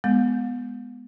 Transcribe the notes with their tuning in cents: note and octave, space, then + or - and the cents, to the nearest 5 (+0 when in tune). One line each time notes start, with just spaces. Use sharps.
G#3 +0 B3 +0